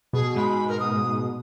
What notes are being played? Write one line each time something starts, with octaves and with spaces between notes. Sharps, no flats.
B2 G#4
G#2 B5
A#4
D#6